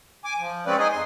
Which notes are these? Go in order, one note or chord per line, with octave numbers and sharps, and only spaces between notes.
G#5 D6
F3
G#3 C4 C#4 B4 D5
D#4 G#4 D#5 G#5
F2 C6